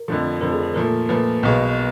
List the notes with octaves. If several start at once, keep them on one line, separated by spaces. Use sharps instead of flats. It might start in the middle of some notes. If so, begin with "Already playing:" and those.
Already playing: A#4
F2 D3 F3 A3
F2 D3 F3 A3 A#4
G#4
A4
A#2 F3 A3 A#4
A#2 F3 A3 B4
B1 B2 G#3